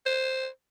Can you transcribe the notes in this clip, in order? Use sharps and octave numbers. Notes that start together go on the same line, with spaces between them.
C5